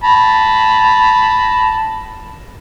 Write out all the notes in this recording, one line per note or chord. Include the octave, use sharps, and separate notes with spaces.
A5 B5